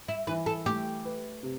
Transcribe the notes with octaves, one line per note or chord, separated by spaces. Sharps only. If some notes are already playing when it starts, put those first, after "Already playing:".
E4
E3 B4
A4
A3 G4
B4
C3